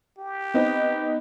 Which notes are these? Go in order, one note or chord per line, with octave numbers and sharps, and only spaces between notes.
G4
B3 C4 D#4